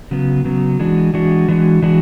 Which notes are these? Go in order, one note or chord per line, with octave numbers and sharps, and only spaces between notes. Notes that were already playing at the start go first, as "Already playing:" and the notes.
C#3 F#3 B3
C#3 F#3 B3
E3 G#3 D4 F#4
E3 G#3 D4 F#4
E3 G#3 D4 F#4
E3 G#3 D4 F#4